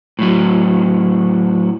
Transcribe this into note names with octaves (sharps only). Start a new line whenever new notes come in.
A2 F#3